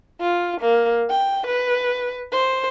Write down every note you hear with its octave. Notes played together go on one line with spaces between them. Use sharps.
F4
A#3
G5
B4
C5